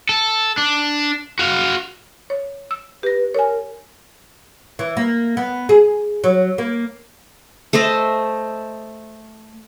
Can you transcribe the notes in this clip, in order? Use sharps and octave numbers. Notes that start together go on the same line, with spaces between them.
A4
D4
F#4 F5
C#5
E6
G4 B4 A#6
A#4 C#5 G#5
E3
A#3
B3
G#4
F#3
A#3
A3 C5 D#5 E5